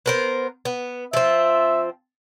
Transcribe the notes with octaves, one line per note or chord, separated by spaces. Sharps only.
B3 A#4 C5
B3
F3 C4 E5